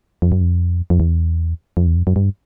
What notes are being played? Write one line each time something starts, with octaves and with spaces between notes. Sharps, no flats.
F2
F#2
F2
F2
E2
F2
E2
F2
F#2
G2